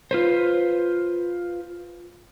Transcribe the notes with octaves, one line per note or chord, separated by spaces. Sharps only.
F4 B4 C5